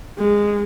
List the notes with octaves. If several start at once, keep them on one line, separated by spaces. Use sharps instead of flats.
G#3